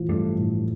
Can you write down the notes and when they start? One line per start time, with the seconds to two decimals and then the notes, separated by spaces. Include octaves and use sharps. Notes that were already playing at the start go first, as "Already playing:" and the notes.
Already playing: A1 A2 F3
0.08 G2 A3
0.39 A2